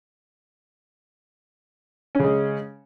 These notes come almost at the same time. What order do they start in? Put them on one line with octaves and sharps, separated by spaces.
C#4 C#3 G#3